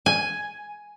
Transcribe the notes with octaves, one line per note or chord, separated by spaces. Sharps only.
G#5